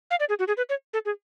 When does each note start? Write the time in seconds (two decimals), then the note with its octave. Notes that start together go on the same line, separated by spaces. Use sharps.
0.11 F5
0.20 D5
0.29 G#4
0.39 F#4
0.48 G#4
0.57 B4
0.69 C#5
0.93 A4
1.05 G#4